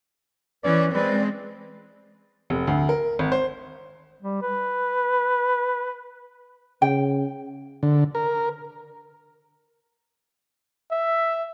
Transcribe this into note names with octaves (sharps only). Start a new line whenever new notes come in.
E3 C#4 B4 D5
G#3 C4 B4 D5
F1
D2
A#4
G#1
C5
G3
B4
C#3 G5
D3
A#4
E5